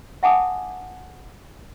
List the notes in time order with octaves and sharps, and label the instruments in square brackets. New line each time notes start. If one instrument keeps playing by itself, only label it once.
[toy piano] E5 F#5 G#5 A5 D6 D#6